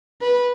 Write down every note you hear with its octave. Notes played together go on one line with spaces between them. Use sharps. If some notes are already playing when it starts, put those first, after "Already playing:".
B4